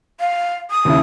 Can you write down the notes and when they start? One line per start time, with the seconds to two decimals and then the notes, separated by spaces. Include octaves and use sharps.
0.20 F5
0.71 D#6
0.85 D#2 C#3 E4